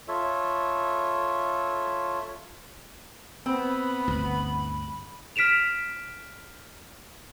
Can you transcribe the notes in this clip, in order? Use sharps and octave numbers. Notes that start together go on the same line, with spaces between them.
F4 A4 C#5 E5
B3 C4 B5
G1 D2
F6 B6 D7 E7 F7